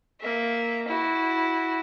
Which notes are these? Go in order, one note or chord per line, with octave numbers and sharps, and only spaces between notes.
A#3 E5
E4 F#4